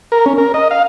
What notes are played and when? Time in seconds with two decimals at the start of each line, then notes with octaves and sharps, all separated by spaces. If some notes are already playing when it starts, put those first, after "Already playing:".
0.12 A#4
0.26 C#4
0.38 A#4
0.54 D#5
0.71 F5